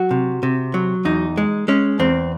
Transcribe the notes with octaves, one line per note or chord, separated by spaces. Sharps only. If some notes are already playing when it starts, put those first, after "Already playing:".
Already playing: F#3 F#4
C3
C3
F#3
E2 D#4
G#3
G#3 C#4
E2 C4